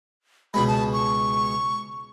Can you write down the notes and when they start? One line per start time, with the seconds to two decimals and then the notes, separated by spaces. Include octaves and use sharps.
0.54 C#2 B2 G#3 B5
0.68 A5
0.93 C#6